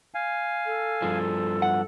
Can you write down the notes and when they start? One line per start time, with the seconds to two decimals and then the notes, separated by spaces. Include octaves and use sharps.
0.14 F5 G#5
0.66 A4
1.02 G2 F3 G#4
1.62 F#5